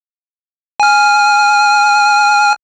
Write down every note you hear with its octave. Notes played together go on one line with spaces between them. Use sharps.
G#5 F6